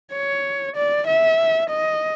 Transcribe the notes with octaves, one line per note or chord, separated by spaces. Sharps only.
C#5
D5
E5
D#5